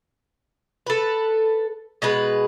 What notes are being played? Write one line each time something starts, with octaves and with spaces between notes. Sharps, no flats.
A4 B4
B2 G#3 B4